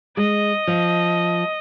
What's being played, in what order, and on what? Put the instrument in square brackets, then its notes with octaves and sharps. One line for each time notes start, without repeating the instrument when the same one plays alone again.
[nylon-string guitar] G#3 [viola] D#5
[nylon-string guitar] F3